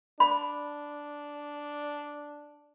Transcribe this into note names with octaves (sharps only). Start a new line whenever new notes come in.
D4 B5